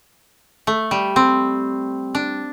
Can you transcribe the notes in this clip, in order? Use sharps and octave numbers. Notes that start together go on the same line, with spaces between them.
A3
G3
C4
D4